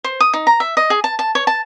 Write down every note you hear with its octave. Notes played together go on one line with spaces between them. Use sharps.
C5
D#6
D#4
A#5
E5
D#5
G#4
A5
A5
C#5
A5